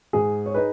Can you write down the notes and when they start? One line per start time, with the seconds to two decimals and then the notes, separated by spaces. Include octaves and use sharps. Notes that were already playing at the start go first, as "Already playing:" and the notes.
0.13 G#2 G#4
0.46 C#5
0.54 D#4 G#4 B4